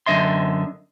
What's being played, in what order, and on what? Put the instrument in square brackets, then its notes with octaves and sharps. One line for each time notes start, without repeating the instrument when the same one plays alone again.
[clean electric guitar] F#2 D3 A#3 D#5 E5 C6